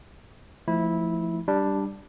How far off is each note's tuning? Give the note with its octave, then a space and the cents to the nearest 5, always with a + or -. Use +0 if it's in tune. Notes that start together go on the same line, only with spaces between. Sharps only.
F3 -20 A3 +0 E4 -15
G3 +0 D4 +0